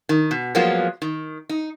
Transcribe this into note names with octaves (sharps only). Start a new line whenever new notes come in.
D#3
B2
F3 F#3 G#3 A#3 B3 F4
D#3
D#4